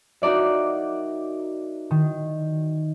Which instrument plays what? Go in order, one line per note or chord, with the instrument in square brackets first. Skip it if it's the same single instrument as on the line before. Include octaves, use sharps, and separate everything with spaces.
[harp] D#4 F#4 A#4 D5 E5
D#3